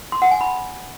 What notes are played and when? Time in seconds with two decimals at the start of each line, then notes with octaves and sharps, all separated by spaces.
0.12 C6
0.22 F#5
0.31 G#5
0.41 B5